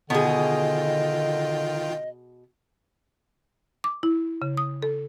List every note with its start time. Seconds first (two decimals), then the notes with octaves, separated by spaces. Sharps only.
0.10 B2 D3 D#3 F4 G#4 D#5 G5
3.84 D6
4.03 E4
4.42 C#3
4.57 D#6
4.83 A4